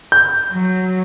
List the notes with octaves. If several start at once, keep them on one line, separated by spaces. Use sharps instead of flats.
G6
F#3